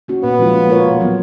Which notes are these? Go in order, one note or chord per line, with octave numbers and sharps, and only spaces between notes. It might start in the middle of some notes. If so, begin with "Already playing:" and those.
A#3 C#4 F#4
A#2 B3
F3 G#3 C#4 F4
A#3
F4 A#4 C#5
B2
F#3 B3